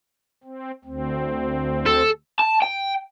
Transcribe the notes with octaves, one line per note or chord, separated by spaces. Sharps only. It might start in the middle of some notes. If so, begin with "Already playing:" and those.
C4
D2 C4
A4
A5
G5